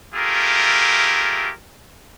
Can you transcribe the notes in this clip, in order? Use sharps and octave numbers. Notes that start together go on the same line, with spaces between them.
A3 E4 F4 G4 G#4 A#4